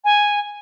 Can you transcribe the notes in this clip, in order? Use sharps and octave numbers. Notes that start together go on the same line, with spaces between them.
G#5